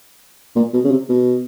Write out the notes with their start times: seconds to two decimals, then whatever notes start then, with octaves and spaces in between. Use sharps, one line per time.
0.56 A#2
0.74 B2
0.85 C#3
0.91 C3
1.09 B2